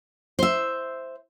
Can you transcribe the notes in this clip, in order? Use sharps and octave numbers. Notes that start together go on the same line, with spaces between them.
C5 E5